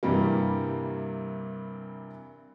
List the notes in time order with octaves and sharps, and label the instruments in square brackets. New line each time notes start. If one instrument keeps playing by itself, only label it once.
[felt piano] G2 C3 E3 G3 A#3